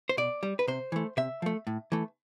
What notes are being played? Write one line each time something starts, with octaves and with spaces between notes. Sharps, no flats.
C5
B2 D5
G3
B4
C3 C5
E3 A3
C3 E5
F3 A3
A2
E3 A3